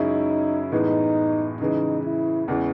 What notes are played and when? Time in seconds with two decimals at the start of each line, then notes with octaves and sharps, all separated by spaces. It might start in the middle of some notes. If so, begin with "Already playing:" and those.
Already playing: F#2 C#3 G#3 C#4 D#4 E4
0.72 A2 E3 G#3 B3 D#4
1.60 C#3 E3 G#3 D#4
2.05 E4
2.48 E2 C#3 E3 G#3